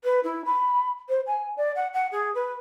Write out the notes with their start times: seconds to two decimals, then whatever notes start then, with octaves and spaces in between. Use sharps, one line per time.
0.04 B4
0.24 E4
0.45 B5
1.09 C5
1.27 G#5
1.57 D5
1.76 F#5
1.93 F#5
2.12 G#4
2.35 B4